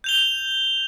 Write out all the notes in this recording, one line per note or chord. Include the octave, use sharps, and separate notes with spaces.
G6 F7 G7